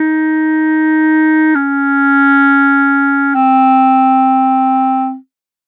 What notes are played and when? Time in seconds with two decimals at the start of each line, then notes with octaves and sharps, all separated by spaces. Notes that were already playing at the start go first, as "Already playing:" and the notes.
Already playing: D#4
1.55 C#4
3.35 C4